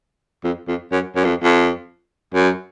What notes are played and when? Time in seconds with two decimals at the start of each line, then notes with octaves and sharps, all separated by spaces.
0.44 F2
0.68 F2
0.92 F#2
1.16 F#2
1.25 F2
1.43 F2
2.34 F#2